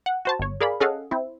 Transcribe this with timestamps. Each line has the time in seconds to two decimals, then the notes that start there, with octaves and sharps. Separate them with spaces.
0.06 F#5
0.25 F#4 C5 A5
0.39 G1 C#5
0.61 G#4 A#4 D5 F5 B5
0.80 C#4 G#4 A4 D#5 F5 F#5
1.11 C4 E4